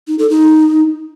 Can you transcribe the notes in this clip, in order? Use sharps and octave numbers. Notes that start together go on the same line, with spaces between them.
D#4
A4
D#4